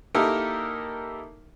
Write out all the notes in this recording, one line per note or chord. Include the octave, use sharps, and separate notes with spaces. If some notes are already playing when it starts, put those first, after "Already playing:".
A#3 D#4 E4 G4 A4 A#4